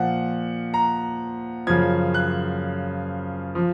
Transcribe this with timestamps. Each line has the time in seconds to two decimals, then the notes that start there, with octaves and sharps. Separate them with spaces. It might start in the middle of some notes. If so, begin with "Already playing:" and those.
Already playing: A#2 F3 F#5
0.74 A#5
1.67 F#2 C#3 F3 G#6
2.14 F#6
3.55 F3